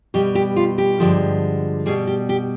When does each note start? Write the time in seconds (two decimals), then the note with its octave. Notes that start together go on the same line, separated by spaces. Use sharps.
0.14 B2 G3 G4
0.35 G4
0.56 F4
0.78 G4
1.00 G2 D3 F3 G#3
1.86 B2 G3 G#4
2.07 G4
2.29 G4